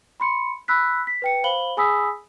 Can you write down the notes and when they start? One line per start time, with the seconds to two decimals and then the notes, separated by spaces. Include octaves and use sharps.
0.20 B5 C6 C#7
0.68 B5 E6 F#6 B6
1.07 B6
1.22 B4 G5 C#7
1.44 C5 F5 B5 F#7 G7
1.77 G#4 G#5 B5 D#6 E6 B6